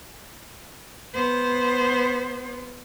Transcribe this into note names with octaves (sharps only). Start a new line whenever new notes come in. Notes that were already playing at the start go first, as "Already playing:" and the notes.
B3 C5